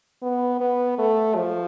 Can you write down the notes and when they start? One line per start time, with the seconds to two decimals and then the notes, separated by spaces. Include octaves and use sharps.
0.22 B3
0.60 B3
0.98 A3
1.36 F3